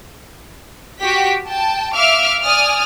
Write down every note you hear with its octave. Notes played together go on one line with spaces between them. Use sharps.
F#4 G4 B6
G5 A5
E5 F5 D6 F6
D5 G#5 D#6 F6